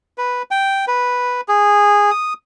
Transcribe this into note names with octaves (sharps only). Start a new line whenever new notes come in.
B4
G5
B4
G#4
D#6